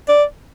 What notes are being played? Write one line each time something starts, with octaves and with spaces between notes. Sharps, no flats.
D5